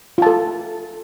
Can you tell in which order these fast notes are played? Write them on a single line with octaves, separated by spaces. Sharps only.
F4 A5 A4